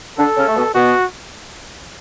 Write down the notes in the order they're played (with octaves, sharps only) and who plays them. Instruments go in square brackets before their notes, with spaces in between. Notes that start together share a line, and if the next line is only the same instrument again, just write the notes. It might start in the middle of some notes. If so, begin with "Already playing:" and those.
[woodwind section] D3 D4 [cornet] A4
[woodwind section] C#3 C#4
A3
B2 B3
[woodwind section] B2 B3 [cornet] F#4